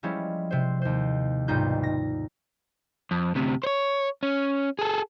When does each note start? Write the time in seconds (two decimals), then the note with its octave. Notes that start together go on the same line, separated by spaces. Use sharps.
0.03 F3 G3 G#3 C#4 E4
0.51 C3 C5
0.82 D#2 C5
1.48 B1 G#2 G3 D#4 F4 G6
1.83 A#6
3.11 F2
3.35 D2 C3
3.63 C5 C#5
4.23 C#4
4.79 G#4 A4